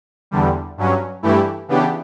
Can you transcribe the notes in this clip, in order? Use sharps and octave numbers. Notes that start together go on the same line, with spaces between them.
E2 D3 G3
G2 F#3 C#4
G2 E3 A3 E4 G4
C#3 E3 B3 D4 G4